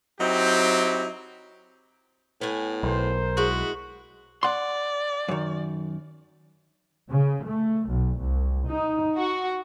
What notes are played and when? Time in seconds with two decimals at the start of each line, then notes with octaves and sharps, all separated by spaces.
0.20 F#3 C4 D#4 E4 G4
2.41 A2 B3 G#5
2.83 B1 A#4 C5
3.37 G#3 E4 F#4
4.43 D5 F#5 C6
5.29 F#2 D#3
7.09 C#3
7.46 A3
7.88 B1
8.19 C2
8.66 D#4
9.18 F#4